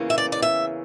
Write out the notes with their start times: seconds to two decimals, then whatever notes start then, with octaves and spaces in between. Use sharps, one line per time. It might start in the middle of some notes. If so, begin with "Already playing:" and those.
Already playing: E2 C#3 E3 A#3 C#4
0.10 E5
0.18 D5
0.32 D5
0.42 E5